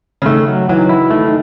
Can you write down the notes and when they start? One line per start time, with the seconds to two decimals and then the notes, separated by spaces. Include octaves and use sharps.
0.22 C#3
0.26 D#3 A3
0.48 F#3
0.69 E3 F#3
0.77 D#3
0.85 E3 E4
1.10 D#3 A3
1.25 D#3